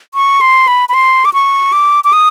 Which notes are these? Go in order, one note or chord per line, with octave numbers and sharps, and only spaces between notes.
C#6
C6
B5
B5
C6
D6
C#6
D6
D6
D#6